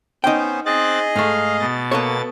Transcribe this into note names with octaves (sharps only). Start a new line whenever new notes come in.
B3 C#4 D#4 C5 G5
C4 G#4 D#5 F#6 A6
G#2 A3 F5
B2 A6
A#3 B3 A4 C#5